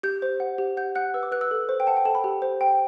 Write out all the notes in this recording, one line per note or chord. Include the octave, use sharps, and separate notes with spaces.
G4 G6
C5
F#5
G4
F#5 G6
F#5 F#6
B4 E6
D6
B4 F#6
E6
A4
C5
G5
F#5 A5
G5
A4 A5
B5
G4
C5
G5